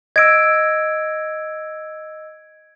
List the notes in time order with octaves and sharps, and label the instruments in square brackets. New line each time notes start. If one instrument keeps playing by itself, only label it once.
[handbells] D#5 E6 [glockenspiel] G#6 D7